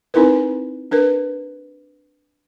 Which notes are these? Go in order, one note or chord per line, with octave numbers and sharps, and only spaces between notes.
C4 D#4 E4 A#4 B4
D4 A#4 B4